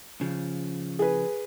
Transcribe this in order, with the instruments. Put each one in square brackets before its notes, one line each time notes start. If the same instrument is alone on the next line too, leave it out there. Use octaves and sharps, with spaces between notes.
[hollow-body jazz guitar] C#3 F3
[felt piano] G#4 B4